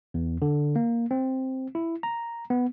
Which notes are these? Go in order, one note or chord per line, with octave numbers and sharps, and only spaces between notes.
E2
D3
A#3
C4
E4
A#5
B3